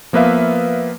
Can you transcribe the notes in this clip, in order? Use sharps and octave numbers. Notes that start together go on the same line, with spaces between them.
F3 A#3 B3 B4 E5 F5